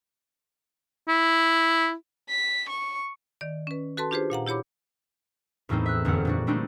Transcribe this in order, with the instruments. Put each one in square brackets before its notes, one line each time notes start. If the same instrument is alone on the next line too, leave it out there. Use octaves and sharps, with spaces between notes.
[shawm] E4
[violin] B6
C#6
[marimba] D#3 D5
C#4 B4
F#4 A4 B4 A5 C6
D4 F4 G4 G#4 B4 C5
A#2 F5 F#5 A#5
E4 G4 C#5 B5 D6
[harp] E2 A2 E3 A#3 C4 D#4
E5 E6 F#6
G1 F2 C#4 F#5
A#2 D4 F#4
G3 A3 C4 D4 D#4